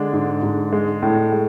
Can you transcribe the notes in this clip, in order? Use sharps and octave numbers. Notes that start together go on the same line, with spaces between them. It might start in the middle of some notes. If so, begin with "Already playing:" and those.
Already playing: D3 G#3 D4
G#2
G#2
G#3
A2
G#3